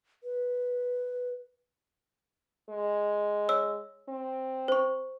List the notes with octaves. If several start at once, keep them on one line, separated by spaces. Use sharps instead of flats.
B4
G#3
C#5 E6
C4
C5 C#6